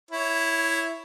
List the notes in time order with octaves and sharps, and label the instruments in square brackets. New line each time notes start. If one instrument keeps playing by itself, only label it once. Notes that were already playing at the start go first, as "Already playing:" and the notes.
[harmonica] E4 C#5